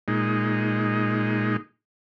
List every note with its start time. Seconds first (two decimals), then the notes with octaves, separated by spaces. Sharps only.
0.08 A#2 G#3 D#4